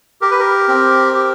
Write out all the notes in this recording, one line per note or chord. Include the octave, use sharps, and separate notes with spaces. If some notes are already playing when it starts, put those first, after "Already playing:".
G4 A#4
B4
A#4
C4
G4